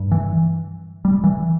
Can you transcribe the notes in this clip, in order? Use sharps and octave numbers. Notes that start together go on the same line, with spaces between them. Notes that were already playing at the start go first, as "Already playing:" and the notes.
Already playing: G2
E3
G3
E3